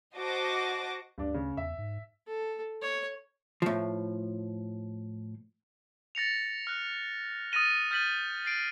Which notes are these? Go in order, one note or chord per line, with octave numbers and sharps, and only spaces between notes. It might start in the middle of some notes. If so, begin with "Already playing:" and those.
F#4 C5 D#5 A5 D6 A#6
D2 G2 D4
C#3
E2 E5
G#2
A4
C#5
A2 F3
A6 A#6 C#7 F7
F6 F#6
D#6 F6 A6 A#6 D#7 G7
F6 G6 A6 B6 D#7 F#7
A6 C7 D7